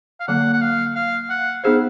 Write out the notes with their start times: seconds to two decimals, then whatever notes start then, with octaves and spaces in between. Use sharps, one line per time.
0.20 F5
0.28 D3 F#3 A#3 F#5
0.53 F#5
0.61 F5
0.95 F5
1.30 F#5
1.64 B3 D#4 G#4 C5 F5